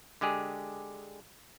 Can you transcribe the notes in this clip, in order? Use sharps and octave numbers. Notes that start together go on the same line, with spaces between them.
D3 G#3 G4 G#4